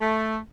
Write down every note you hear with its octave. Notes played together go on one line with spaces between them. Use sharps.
A3